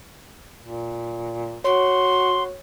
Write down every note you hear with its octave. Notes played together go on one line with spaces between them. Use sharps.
A#2
F#4 C#5 C6